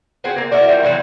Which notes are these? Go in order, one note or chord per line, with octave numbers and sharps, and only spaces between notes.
B3 C4 F#4 G#4
A#3 C4
E4 F#4 A#4 D5
F3 G3 A#3
C3 E3 F#3 B3